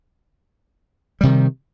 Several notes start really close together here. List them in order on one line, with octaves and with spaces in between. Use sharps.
G3 C3 D#3